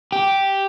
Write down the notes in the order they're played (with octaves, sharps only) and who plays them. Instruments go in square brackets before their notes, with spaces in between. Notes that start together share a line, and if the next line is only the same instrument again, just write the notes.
[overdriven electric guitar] G4